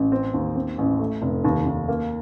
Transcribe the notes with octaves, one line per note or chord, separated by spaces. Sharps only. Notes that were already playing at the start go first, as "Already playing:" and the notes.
Already playing: A1
C4
D#2
C4
A1
A3
F1
D#2
D#2
A#3